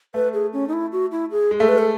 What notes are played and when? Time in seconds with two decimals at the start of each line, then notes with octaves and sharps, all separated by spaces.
0.14 A3 B4
0.33 G#4
0.53 C#4
0.68 D#4
0.73 E4
0.92 F#4
1.12 E4
1.31 G#4
1.51 G#3
1.59 A3 A4
1.69 B4
1.78 A4